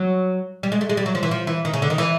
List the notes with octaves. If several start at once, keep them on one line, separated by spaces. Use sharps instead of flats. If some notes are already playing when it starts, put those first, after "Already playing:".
Already playing: F#3
G3
G#3
A3
G#3
G3
F#3
F3
E3
F3
E3
D#3
C#3
D3
D#3
E3